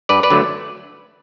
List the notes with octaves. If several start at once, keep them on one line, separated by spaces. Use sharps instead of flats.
G2 B4 D5
B4 D5
D3 F#3 A3